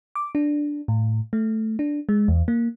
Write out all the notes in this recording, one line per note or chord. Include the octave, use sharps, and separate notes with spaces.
D6
D4
A2
A3
D4
G#3
E2
A#3